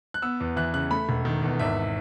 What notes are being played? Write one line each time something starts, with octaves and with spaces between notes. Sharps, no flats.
F#6
B3 E6
E2
E3 F#6
C#3 F#6
A3 B5
E1
D#3
E2
G#1 E5